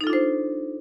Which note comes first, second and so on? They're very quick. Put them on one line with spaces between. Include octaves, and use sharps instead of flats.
D#4 A4 F4 D4 C5